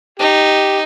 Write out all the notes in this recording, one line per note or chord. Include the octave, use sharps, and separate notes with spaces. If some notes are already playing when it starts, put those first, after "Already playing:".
D#4 G4